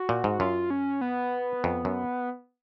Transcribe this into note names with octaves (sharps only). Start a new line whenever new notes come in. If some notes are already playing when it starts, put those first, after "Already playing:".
Already playing: F#4
A#2
G#2
F#2 F4
C#4
B3
F2
F#2